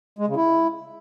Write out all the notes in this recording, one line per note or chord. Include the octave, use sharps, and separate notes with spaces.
G#3
C#3
E4